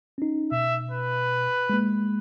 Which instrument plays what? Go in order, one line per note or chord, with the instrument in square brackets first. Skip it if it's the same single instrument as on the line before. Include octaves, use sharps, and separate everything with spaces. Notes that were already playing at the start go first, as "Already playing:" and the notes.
[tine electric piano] C#4 D#4
[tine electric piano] B2 [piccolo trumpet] E5
[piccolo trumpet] B4
[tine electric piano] G#3 A#3